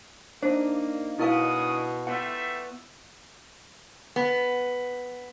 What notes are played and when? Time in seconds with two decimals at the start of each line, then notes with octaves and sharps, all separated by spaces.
0.43 A#3 D4 D#4 C5
1.19 B2 G#3 C#4 E4 A#4 F5 D#6
2.07 G3 A3 B3 F4 E5 F#5
4.16 B3